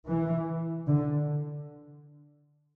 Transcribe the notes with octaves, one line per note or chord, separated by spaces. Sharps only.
E3
D3